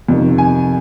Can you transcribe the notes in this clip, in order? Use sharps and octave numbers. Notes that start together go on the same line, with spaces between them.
F2 C3 D#3
G#5